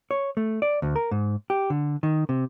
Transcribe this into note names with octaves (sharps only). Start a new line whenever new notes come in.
C#5
A3
D5
D2
A#4
G#2
G4
D3
D#3
C3